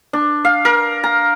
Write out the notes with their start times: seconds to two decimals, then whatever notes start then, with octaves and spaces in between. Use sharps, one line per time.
0.13 D4
0.45 F5
0.65 A#4
1.04 A#5